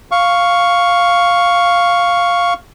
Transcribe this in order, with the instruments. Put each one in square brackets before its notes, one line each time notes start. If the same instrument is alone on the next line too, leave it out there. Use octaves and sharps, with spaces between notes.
[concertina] F5 C#6